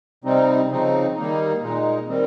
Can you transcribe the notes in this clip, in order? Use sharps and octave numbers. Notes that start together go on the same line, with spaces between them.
C3 G3 C4 D#4
C#3 F3 C4 D#4
D#3 G3 A#3 D#4
A#2 G#3 D#4
D#3 G3 C4